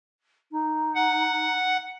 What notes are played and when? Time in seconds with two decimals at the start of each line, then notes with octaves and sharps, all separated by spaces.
0.51 D#4
0.95 F#5